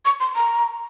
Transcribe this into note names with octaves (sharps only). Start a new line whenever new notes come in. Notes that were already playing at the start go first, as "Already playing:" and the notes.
C#6
C6
A#5